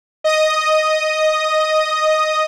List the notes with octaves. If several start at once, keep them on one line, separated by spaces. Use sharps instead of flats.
D#5 D#6